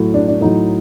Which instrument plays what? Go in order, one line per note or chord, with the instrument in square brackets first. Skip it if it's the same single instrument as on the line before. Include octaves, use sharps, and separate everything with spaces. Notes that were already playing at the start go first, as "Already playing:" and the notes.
Already playing: [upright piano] A2 F#3
D4
D4
A2 F#3 D#4